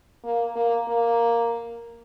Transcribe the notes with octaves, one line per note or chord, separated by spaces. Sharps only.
A#3
A#3
A#3